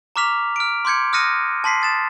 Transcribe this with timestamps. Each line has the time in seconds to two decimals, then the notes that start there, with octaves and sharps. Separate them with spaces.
0.16 A#5 C#6 D6 F6 B6 F7
0.56 F6 D7
0.85 C6 D6 G6 G#6 C#7
1.13 D#6 F6 F#6 A#6 C#7 D#7
1.64 A5 C6 B6 C7
1.82 D#6 A6 E7